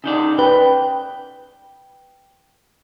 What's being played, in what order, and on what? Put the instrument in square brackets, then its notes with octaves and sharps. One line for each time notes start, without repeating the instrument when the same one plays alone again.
[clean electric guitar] C#3 D#4 D5
[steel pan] B4 [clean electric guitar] G5